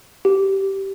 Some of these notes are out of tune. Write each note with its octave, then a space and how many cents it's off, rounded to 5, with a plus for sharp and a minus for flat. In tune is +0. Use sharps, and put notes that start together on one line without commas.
G4 -15